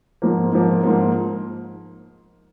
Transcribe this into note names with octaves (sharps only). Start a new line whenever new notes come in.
G#2 F3 A#3
G#2 F3 A#3
G#2 F3 A#3